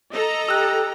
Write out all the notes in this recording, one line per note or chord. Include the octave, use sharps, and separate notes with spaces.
A4 D#5 A#5
G4 E6 F#6